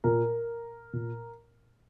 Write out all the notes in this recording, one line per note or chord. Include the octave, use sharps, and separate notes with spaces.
A#2 A#4
A#2